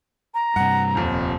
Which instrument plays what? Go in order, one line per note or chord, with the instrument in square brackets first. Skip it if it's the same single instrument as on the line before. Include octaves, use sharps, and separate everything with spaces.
[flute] A#5
[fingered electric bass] G2 C3 [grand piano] F#5
[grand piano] D#1 F2
[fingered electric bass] F1